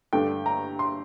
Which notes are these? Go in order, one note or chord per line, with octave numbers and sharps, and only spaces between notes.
G2 D3 A3 D4 G5
A#5
C6